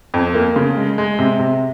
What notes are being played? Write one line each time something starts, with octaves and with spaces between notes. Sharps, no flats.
F2
A#3
C#3
G#3
G#3
C3
C3